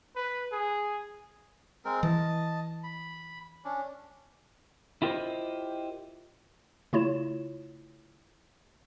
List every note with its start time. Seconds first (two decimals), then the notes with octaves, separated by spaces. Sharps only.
0.16 B4
0.52 G#4
1.85 G#3 C4 A#4
2.03 E3 D#5 A5
2.84 B5
3.65 C#4 D4
5.02 E4 F4 G4 A#4 C5 D#5
6.93 C#3 A3 E4 F4 C#5 E7